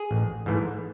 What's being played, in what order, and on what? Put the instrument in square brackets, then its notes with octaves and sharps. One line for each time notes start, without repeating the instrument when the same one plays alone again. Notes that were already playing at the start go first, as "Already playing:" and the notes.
Already playing: [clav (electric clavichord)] G#4
A1
G#2 E3 A3